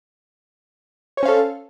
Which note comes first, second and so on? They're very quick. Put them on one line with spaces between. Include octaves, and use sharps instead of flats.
C#5 C5 C#4 F5 A4